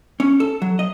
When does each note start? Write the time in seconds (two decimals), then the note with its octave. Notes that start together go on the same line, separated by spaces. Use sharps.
0.20 C#4
0.40 A4
0.62 F#3
0.79 D#5